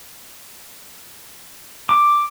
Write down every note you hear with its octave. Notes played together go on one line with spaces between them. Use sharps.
D6